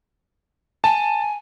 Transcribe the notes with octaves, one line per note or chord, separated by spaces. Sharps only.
G#5 A5